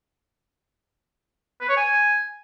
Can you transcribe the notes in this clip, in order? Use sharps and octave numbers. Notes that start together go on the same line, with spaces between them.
B4
C#5
G#5